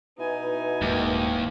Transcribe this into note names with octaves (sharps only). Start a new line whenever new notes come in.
B2 D#4 E4 B4 G#5
D#1 D#2 G#2 D#3